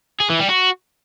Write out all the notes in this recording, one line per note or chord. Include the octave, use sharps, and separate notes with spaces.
G#4
E3
G3
F#4